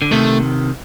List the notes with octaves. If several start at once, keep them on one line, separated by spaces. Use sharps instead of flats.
D3
C3 D#3 A3